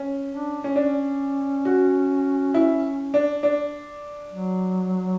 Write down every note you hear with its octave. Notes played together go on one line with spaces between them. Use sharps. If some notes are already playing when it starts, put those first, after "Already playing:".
Already playing: C#4
D4
C#4
C#4 D4
F#4
E4
D4
D4
F#3